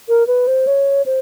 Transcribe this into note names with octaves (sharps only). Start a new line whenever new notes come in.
A#4
B4
C5
C#5
C5